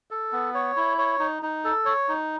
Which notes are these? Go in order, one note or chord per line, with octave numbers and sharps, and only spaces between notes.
A4
B3
C#5
E4
C#5
D#4
D#4
A4
C#5
D#4